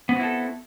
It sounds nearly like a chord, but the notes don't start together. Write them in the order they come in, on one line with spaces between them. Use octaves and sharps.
B3 C4 F#4 E4 A4